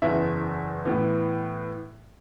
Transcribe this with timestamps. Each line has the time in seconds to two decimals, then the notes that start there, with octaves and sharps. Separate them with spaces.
0.02 F#1 E2 E3 E5
0.85 A2 E3 B3